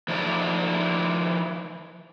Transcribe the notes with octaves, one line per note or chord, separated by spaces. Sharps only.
F3 D#4 E4 A4 D5